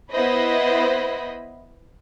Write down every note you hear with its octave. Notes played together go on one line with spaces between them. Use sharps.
B3 E4 C5 D#5 B5